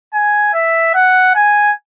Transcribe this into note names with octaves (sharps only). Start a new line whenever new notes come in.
G#5
E5
F#5
G#5